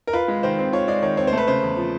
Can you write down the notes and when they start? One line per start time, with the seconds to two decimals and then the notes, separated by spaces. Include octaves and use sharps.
0.07 A#4
0.13 F4 B4
0.28 G#3
0.43 D#3 C5
0.59 C4
0.73 F4 C#5
0.88 G#3 D5
1.02 D#3 C#5
1.17 C4 C#5
1.27 C5
1.33 A3 B4
1.47 C#3 C5
1.63 E2
1.77 F3